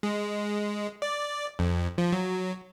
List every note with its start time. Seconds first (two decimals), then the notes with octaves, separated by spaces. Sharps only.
0.03 G#3
1.02 D5
1.59 F2
1.98 F3
2.13 F#3